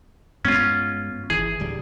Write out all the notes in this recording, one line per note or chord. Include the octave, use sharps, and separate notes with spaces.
G2 G#3 B3 C#4 F4
G1 E3 G#4
D1 D3 G3